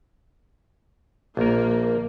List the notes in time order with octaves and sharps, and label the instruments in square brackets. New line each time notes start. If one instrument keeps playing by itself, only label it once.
[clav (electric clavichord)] A#1 A#4 [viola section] A#3